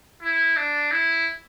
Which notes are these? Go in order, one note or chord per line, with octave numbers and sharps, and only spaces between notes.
E4
D4
E4